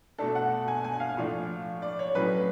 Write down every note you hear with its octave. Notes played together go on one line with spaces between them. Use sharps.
B2 A3 D4 A4
F#5
G#5
G#5
F5
A2 F3 A3 D4
D5
C#5
A2 F#3 C#4 B4